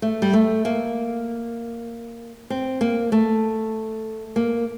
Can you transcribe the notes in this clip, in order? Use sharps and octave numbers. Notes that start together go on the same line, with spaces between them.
A3
G3
A3
A#3
C4
A#3
A3
A#3